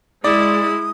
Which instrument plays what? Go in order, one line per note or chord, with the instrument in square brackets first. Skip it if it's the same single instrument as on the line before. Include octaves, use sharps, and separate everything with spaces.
[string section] G#3 [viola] E4 [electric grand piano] D5 [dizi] D#6